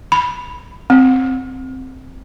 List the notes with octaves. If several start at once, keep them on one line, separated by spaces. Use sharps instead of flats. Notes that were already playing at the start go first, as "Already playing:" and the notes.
B5
C4